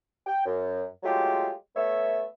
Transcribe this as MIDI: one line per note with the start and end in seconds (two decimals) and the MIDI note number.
0.26 0.43 79
0.46 0.83 42
1.03 1.51 54
1.03 1.51 56
1.03 1.51 57
1.03 1.51 65
1.03 1.51 67
1.75 2.24 57
1.75 2.24 59
1.75 2.24 73
1.75 2.24 76